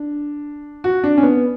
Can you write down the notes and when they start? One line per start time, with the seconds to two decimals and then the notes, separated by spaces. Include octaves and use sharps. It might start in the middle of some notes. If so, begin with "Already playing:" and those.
Already playing: D4
0.84 F#4
1.04 D4
1.18 C#4
1.23 B3